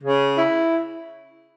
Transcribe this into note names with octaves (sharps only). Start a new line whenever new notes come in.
C#3
E4